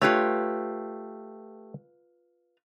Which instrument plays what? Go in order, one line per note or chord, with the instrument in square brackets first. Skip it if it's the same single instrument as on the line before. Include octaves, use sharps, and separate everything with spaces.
[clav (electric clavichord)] A3 G4 [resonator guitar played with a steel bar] F4 B4 C#5